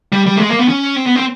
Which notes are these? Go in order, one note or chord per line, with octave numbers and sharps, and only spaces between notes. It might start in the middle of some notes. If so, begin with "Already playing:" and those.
G3
G3
A3
G#3
A#3
B3
C#4
C4
B3
C4